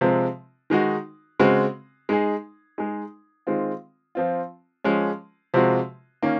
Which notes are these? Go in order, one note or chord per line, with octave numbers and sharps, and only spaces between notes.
C3 F3 G#3 C4
D#3 G#3 D#4 F#4
C#3 G#3 C4 F#4
G#3 D#4 G#4
G#3 D#4 G#4
D#3 G#3 C4 F4
F3 C4 F4
F3 G#3 C#4
C3 F3 G#3 C4 F#4
D#3 A#3 C#4